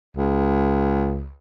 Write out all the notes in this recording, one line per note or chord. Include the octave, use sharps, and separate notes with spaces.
C#2